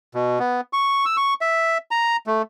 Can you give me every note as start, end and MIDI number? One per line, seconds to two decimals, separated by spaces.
0.15 0.39 47
0.40 0.61 59
0.73 1.05 85
1.05 1.17 88
1.17 1.34 85
1.41 1.78 76
1.91 2.17 82
2.27 2.42 57